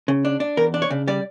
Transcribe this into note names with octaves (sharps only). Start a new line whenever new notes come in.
C#3
D4
D4
E2 A#4
D4
C#5
C#3
G3 D5